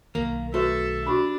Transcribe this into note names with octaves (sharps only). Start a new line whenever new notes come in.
B1 D#3 A#3
A3 E4 F#4 A4 B4 E5
D4 F#4 G4 B5